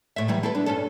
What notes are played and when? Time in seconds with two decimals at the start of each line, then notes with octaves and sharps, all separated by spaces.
0.16 A2 E5
0.28 E3 F#3 G3
0.43 E4 A4 B4
0.55 D4
0.66 G2 C#4 A4